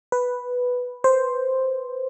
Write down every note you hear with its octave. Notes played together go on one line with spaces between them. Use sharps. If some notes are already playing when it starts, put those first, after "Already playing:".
B4
C5